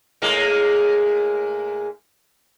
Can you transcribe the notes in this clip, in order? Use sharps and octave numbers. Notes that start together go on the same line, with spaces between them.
A2 G#3 A#3